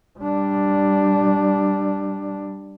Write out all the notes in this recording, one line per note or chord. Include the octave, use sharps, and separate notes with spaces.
G3 D4